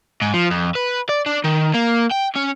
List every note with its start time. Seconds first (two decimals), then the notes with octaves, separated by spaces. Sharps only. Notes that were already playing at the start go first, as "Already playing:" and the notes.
0.22 G#2
0.34 F3
0.50 F2
0.75 B4
1.09 D5
1.26 D4
1.44 D#3
1.74 A#3
2.11 G5
2.36 C#4